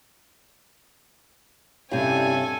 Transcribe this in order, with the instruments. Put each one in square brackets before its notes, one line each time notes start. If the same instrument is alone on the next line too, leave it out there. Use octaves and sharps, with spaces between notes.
[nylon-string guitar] G2 C3 [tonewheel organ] G3 C#4 E4 [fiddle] A4 G#5